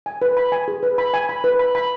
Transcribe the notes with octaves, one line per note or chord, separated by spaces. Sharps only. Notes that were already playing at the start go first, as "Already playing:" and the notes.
G#5
B4
B5
G#5
G#4
B4
B5
G#5
B5
B4
B5
B5